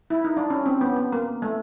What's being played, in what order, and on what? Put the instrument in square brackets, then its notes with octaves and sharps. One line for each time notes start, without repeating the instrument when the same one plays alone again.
[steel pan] E4
D#4
D4
C#4
C4
B3
B3
A#3
A3